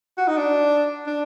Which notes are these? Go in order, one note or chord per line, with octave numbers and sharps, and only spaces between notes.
F#4
D#4
D4
D4